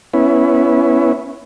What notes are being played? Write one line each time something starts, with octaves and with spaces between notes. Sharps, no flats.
B3 C#4 E4